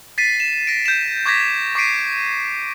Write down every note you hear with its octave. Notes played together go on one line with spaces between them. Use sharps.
A6 B6 C7 D#7
E7
A#6 D7
G6 E7
C#6 D6 G6 G#6 A#6 B6
C#6 D6 B6 C7 D7 D#7